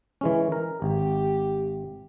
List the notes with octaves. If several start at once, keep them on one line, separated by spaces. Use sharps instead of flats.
E3 G#3 C#4
A#4
G#1 G4